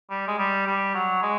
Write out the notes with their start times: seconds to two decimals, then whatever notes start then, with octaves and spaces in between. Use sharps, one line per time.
0.10 G3
0.28 G#3
0.38 G3
0.66 G3
0.94 F#3
1.23 G#3